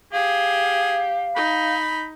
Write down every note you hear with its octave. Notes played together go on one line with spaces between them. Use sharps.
G4 G#4 F5
D#4 B5